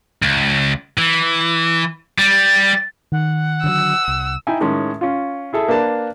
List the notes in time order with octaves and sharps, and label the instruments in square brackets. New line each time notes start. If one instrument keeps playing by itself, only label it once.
[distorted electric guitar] C#2
E3
G3
[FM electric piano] D#3 [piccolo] F#5
[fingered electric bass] D3 E3 F#3 [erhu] E6
[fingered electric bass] C2
[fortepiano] D#4 E4 G5 G#5
A2 D#3 G#3 C#4
C#4 F4
E4 G#4 A4 E5
A#3 D4 B4 A5